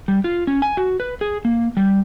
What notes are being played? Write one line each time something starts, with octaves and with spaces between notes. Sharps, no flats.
G3
F4
C#4
G#5
F#4
B4
G#4
A#3
G3